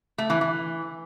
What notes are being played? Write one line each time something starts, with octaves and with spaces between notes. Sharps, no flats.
A3
E3
E3